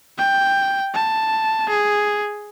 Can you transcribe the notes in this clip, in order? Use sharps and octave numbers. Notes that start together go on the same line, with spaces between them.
G5
A5
G#4